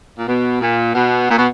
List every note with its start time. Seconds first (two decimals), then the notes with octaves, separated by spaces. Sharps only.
0.17 A#2
0.27 B2
0.61 A#2
0.95 B2
1.29 A#2
1.38 B2